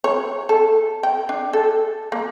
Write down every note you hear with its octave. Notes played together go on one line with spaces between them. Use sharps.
C#5
A4
G5
D4
A4
A#3